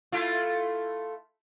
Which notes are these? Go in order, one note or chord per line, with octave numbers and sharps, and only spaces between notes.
A3 E4 F4